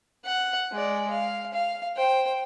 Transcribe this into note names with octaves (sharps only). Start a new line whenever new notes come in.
F#5
G#3 D5
F5
F5
C5 G5